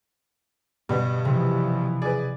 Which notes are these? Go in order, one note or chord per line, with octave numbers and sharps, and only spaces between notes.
G2 B2 G3 B3
C3 E3 F3
G#4 B4 D5